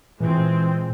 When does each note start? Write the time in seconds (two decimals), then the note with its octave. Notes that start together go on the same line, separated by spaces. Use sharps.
0.20 A#2 E3 G#3 C4